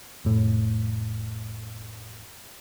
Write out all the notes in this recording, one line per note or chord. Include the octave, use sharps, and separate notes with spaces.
F1 A2